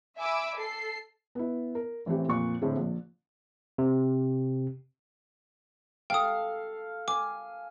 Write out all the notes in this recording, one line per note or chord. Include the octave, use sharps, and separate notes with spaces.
E5 G#5 B5 D6 E6
A4 C7
B3 E4
A#4
A1 E3 A3 C4 G4
F2 A#2 C#6 F#6
A2 D3 C4 G#4
A#1
C3
A4 F5 G5 D#6
G#5 D6